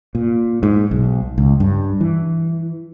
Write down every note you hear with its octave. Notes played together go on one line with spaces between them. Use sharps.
A#2
G#2
B1
C#2
G2
E3